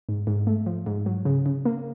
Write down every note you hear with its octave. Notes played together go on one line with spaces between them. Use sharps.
G#2
G#2
A3
F3
G#2
F#3
C#3
C#3
A#3